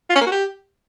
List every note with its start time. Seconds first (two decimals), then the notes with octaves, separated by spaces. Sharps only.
0.10 F4
0.16 C#4
0.21 A#3
0.27 F#4
0.32 G4